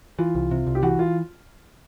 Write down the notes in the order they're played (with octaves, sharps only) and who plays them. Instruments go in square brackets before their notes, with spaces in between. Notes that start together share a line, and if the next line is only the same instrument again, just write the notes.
[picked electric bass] E3 [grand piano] F4
[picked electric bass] C2
C3
C2
[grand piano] G4
[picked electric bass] E3 [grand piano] F#4
[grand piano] F4